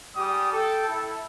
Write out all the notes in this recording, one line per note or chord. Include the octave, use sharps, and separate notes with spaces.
G3 G4 G#4 D#6
A4 G5
E4 A4